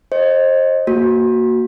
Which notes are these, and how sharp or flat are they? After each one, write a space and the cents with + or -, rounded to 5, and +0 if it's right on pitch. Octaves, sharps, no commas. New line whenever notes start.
C5 +30 D#5 +0
A#3 +0 F#4 +0